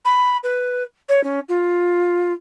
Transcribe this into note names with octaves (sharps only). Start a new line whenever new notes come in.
B5
B4
C#5
C#4
F4